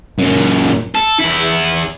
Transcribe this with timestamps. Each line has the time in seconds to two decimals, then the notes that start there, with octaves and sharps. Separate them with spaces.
0.19 F#2 A#2
0.95 A4
1.20 E2 E4